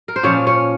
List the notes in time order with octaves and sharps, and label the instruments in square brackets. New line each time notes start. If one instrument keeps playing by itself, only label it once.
[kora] A#4
C5
A#2 F3 C#4 C#5
C#4 C#5